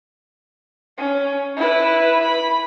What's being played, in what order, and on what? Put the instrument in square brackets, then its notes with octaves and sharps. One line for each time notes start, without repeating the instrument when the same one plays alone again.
[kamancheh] C#4
E4 B4
B5